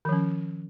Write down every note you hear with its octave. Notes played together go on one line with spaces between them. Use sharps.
D#3 F3 C#4